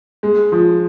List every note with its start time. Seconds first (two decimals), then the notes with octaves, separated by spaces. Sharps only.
0.23 G#3
0.52 F3